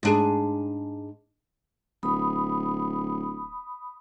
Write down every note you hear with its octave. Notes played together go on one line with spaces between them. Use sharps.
G#2 D4 G#4
D1 B5 D#6